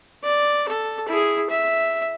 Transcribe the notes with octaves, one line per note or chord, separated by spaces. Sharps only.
D5
A4
E4 G#4
E5